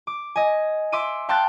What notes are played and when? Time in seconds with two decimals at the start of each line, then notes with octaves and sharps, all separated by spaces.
0.07 D6
0.36 D#5 G#5
0.92 E5 C6 D6 E6 D#7
1.29 F5 G5 A5 C6 F#6 A6